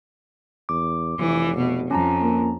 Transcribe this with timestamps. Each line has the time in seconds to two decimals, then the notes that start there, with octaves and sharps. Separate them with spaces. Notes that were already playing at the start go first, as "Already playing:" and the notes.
0.69 E2 D6
1.19 F1 E3
1.57 B2
1.91 F2 C#4 A5 A#5
2.21 A#3